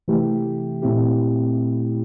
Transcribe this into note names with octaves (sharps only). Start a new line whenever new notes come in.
C3 E3 A3 E4 G4
A#2 A3 C4 E4 G4